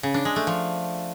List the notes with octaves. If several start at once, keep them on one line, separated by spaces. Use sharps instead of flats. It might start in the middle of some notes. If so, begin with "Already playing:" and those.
C#3
D4
G#3
A3
F3